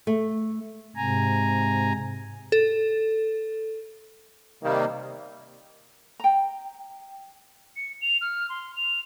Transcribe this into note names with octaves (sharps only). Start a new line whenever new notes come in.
A3
G#2 C3 G#5 A#5
A4
C3 D#3 G3 A#3
G5 A#5
C#7
F7
F6
C6
F7